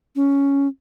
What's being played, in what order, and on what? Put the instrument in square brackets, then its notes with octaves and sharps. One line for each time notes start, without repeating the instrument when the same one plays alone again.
[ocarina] C#4